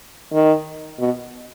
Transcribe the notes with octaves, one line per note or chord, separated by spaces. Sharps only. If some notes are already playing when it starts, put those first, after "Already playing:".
D#3
B2